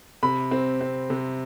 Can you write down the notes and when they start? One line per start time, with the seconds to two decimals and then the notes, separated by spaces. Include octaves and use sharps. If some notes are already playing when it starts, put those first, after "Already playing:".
0.23 C3 B5
0.51 C4
0.81 C4
1.10 C3